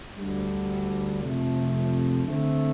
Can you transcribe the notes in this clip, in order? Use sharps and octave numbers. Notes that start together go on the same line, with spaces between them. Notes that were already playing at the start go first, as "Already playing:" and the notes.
D2 D3 G3
F2 C3 F3 A3
D3 A3 C4